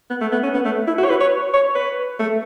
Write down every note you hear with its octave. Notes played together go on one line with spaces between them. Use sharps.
B3
A3
B3
C#4
B3
A3
E4
F#4
C#5
B4
C#5
C#5
B4
A3